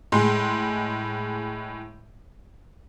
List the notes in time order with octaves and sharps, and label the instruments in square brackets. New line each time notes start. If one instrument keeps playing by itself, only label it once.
[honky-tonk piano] A2 G#3 C6